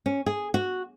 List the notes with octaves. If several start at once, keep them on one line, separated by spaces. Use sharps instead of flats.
C#4
G#4
F#4